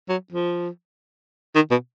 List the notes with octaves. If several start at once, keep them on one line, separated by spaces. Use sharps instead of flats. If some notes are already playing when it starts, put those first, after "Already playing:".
F#3
F3
D#3
B2